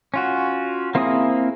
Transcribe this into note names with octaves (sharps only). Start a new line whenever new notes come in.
C#4 F4 F#4
A#3 C4 E4 G#4 D#6